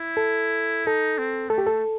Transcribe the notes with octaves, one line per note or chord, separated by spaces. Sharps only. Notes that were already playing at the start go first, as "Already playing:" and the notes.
Already playing: E4
A4
D#4 A4
C4
A3 A4
G4
A4